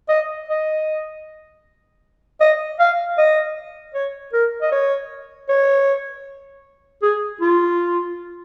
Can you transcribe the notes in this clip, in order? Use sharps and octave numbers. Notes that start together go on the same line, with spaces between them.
D#5
D#5
D#5
F5
D#5
C#5
A#4
D#5
C#5
C#5
G#4
F4